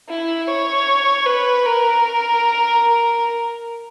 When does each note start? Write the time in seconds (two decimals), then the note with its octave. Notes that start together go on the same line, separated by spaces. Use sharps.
0.09 E4
0.48 C#5
1.26 B4
1.65 A#4